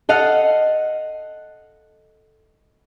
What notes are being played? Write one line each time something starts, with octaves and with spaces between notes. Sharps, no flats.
A4 D#5 F5 F#5